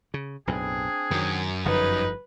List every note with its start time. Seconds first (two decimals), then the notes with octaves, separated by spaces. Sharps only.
0.14 C#3
0.47 B1 F#2 A2 C4 D4 G#4
1.11 F#2 D#3
1.66 G1 D3 F3 D#4 B4